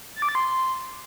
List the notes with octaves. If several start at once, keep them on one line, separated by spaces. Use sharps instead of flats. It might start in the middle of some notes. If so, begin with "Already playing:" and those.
A6
D6
A6
C6